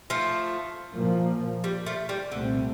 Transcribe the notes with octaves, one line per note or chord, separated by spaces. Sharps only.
F3 A3
A#2 F3 A#3
G3
F3 A3
G3
C2 A#2 D3 A3 C4